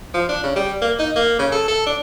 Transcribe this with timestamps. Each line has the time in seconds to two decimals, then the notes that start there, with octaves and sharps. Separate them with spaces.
0.14 F3
0.29 D4
0.44 C#3
0.56 G3
0.82 A#3
0.99 D#4
1.16 A#3
1.39 C#3
1.52 A4
1.68 A4
1.86 D4